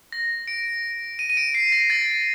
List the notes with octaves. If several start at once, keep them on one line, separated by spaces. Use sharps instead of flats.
A#6
D7
D#7
D#7
D7
C7
A#6
A6